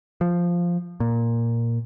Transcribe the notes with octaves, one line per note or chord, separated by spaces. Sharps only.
F3
A#2